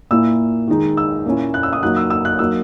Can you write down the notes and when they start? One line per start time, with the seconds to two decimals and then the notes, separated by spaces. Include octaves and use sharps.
0.11 A#2 A#3 E4 E6
0.68 D#3 G#3 D#4
0.97 E6
1.26 A#2 A#3 C#4 E4
1.54 F#6
1.63 E6
1.73 D#6
1.83 F#3 A#3 D#4 F#6
1.96 E6
2.10 E6
2.25 F#6
2.39 F#3 A#3 D#4 E6